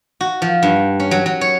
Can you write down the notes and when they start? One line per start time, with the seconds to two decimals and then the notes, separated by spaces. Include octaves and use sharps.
0.21 F#4
0.42 F3
0.63 G2
1.00 C#4
1.11 F#3
1.26 F#3
1.41 C#5